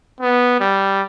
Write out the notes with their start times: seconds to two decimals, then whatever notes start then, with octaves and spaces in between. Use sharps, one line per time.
0.21 B3
0.60 G3